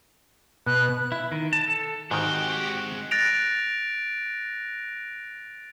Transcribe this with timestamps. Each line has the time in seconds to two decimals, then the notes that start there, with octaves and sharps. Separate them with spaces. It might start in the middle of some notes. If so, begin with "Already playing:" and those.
0.67 B2 F#6
1.12 E4
1.32 D#3
1.53 A5
1.68 A4
2.11 G#2 D#3 G#3 C4 F#4 G4
3.11 F#6 A6 A#6 D7 F7